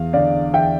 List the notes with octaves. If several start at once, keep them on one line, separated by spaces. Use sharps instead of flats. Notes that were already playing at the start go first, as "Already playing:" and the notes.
Already playing: E2 F5
D3 D5 F5
E2 E5 G5